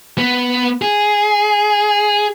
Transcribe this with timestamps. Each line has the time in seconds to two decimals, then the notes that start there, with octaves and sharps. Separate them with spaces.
0.18 B3
0.82 G#4